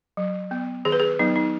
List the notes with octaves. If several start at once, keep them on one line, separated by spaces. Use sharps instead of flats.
F#3
B3
D#3 G#4
B4
G#4
F#3 B3 D#4
D#4